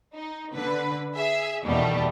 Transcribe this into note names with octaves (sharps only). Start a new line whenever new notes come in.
D#4
D3 B4
G#4 E5
E2 B2 D#3 G3 A3